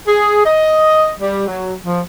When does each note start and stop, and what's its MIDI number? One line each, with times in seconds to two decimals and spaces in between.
0.08 0.42 68
0.45 1.09 75
1.20 1.46 55
1.47 1.74 54
1.85 2.01 53